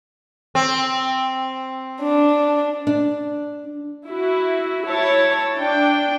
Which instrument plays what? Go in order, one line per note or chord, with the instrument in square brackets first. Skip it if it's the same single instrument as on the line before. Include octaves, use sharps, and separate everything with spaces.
[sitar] C4
[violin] D4
[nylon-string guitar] D4
[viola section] E4 F#4
E4 C#5 A5
D4 G5